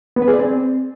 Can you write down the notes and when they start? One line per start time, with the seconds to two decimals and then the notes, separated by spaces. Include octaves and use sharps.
0.16 B3
0.22 B4
0.28 G#4
0.33 D5
0.39 C4